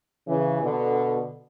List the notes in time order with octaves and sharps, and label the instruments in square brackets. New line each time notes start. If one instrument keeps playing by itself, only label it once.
[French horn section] C#3 E3
B2 D3